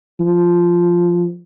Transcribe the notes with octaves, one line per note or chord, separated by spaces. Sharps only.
F3